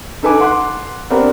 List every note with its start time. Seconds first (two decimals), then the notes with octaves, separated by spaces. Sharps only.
0.23 D#4 A4 B4 G#5 D6
0.40 F#5 C6 D6 F#6
1.10 B3 C4 D4 G4 A#4 B4